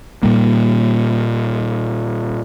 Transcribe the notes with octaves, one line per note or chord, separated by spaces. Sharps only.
A#2 G3 A#3